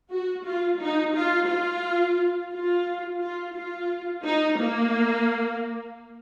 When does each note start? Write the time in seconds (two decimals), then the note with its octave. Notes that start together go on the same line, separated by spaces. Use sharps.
0.11 F#4
0.45 F4
0.80 D#4
1.15 F4
1.49 F4
2.52 F4
3.21 F4
3.55 F4
4.25 D#4
4.59 A#3